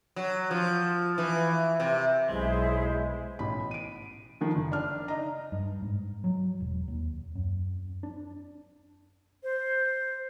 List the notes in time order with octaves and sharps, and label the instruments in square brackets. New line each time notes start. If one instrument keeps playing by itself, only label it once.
[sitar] F#3
F3
E3
C3
[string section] B1 [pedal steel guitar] G#3 [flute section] E4 G#4 E5 [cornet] C5
[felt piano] A1 B2 B5
D7 D#7
D#3 F3
F#1
D4 F6
D#4 D#5 A#5
[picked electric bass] G2
G#2
F#3
E1
D#2
F#2
D4
[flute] C5